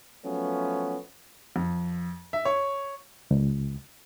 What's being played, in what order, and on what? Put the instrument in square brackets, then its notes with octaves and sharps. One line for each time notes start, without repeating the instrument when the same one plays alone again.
[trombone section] F3 F#3 A3 B3 C#4
[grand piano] F2
E5
C#5
[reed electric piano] C#2